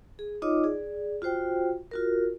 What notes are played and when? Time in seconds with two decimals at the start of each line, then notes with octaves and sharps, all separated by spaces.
0.19 G#4
0.42 D#4 F4 C#5 D#5 D6
0.64 G#4 D5
1.22 F4 F#4 C5 G5
1.91 F4 F#4 A#4